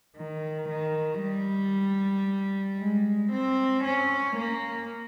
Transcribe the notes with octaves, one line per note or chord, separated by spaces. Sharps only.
D#3
D#3
G3
G#3
C4
C#4
A#3